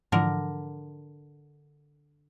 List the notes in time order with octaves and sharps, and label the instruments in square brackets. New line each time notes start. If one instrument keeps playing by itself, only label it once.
[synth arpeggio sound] G#2 E3 F3 [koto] D3 A#4